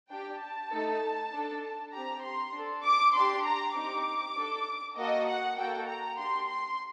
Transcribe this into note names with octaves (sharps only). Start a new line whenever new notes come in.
D4 G4 G5
A5
A3 D#4 A4
D4 A4
C4 G4 A#5
C6
D4 A4
D6
D4 G4 C6
A#5
C4 D#4 G4 D6
D4 A4
A#3 F#4 A4 D#5
F#5
A#3 F#4 A4 G5
A#5
D4 G4 C6
C6